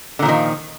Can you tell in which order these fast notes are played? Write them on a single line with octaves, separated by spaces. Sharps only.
D3 A#2 F3 D#3